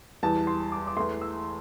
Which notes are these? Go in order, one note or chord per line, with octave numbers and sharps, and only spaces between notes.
E2 E3 G3 A5
C6
D6
D6
E2 E3 A3 C6
E6